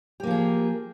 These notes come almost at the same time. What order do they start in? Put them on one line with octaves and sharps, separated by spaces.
G4 A#3 F3 G#4